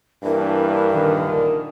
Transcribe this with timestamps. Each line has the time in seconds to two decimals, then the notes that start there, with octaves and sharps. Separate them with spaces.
0.24 G2 E3 A#3 D4 E4 A#4
0.93 A#2 D3 D#3